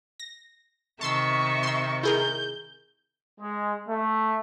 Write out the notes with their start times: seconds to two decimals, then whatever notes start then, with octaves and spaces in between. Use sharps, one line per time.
0.20 A#6
1.01 C3 D#3 E5 A5 C6 C#6 E6
1.63 C6 E6
2.03 E4 G#4 A#4 G6
3.41 G#3
3.89 A3